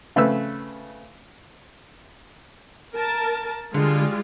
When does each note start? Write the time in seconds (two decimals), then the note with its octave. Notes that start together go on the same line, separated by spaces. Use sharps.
0.16 C#3 A3 C4 B4 E6
2.95 A#4 A5
3.74 D3 G3 G#3 F4